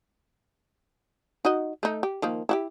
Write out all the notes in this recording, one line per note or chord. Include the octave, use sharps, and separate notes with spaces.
D#4 F#4 D#5
A3 D#4
G4
D#3 F3 A#3
E4 F#4 G4